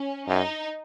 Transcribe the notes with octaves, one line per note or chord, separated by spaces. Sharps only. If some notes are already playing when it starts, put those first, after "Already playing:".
Already playing: C#4
F#2 D#4